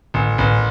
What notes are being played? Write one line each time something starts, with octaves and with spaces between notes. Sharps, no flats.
A1
A1